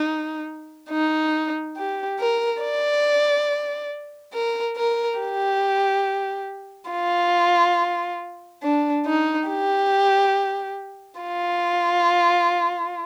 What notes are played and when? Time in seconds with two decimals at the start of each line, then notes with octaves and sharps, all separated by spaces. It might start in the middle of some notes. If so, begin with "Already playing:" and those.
Already playing: D#4
0.90 D#4
1.77 G4
2.19 A#4
2.62 D5
4.33 A#4
4.77 A#4
5.19 G4
6.91 F4
8.63 D4
9.06 D#4
9.48 G4
11.20 F4